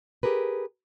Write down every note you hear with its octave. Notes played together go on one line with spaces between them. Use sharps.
G4 G#4 A#4 B4